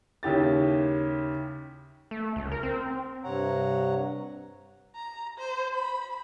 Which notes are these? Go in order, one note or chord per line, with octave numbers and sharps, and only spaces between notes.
D#2 C#3 E4 G4 A6
A3
C#2
A#4
C4
G2 C3 C#5 F#5 A#5
A#5
C5
B5